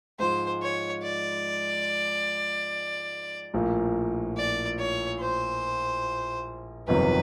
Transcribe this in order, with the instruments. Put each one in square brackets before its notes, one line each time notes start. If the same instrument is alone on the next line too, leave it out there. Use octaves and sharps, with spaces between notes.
[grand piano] G#2 F3 G#3 [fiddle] C5
[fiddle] C#5
D5
[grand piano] A#1 A2 F3 A#3
[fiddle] D5
C#5
C5
[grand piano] G1 F2 C3 D#3 F#3 [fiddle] B4